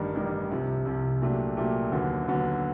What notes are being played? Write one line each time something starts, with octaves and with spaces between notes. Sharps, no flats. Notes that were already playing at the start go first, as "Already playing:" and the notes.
Already playing: A1 G2 D#3 G3
A1 G2 D#3 G3
C2 C3 F3
C2 C3 F3
A#2 F#3 A3 D4 G4
A#2 F#3 A3 D4 G4
D#2 D3 F#3 B3
D#2 D3 F#3 B3